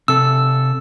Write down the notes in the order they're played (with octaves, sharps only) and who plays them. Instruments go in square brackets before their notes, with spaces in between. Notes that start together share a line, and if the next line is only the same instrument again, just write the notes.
[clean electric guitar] C3 A4 [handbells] E6